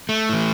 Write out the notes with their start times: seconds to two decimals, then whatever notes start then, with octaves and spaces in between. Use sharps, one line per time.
0.09 A3
0.29 A2 E3